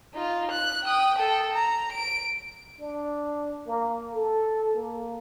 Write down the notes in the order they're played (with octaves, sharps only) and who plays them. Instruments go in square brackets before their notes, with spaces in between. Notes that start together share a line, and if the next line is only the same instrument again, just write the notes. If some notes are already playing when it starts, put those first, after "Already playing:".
[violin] D#4 F4
F#6
G5 D#6
A4 G5
A#5
D7
[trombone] D4
A#3
A4
A#3